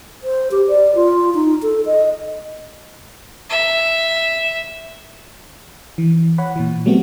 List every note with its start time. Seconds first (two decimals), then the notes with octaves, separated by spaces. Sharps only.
0.23 C5
0.51 G4
0.68 D5
0.95 F4
1.35 D#4
1.63 A4
1.86 D#5
3.50 E5
5.98 E3
6.38 C#5 F#5 B5
6.56 A#2 E3
6.86 F#3 G3 A3 B3 C4 F#4